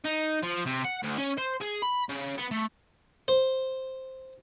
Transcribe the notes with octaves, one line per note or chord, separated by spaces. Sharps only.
D#4
F3
C3
F#5
D2
C#4
C5
G#4
B5
C#3
B3
A3
C5